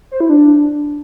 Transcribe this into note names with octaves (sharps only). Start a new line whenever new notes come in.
C5
E4
D4